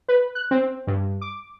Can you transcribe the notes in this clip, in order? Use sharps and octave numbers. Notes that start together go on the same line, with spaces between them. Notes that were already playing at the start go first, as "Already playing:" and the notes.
B4
F#6
C4
G2
D6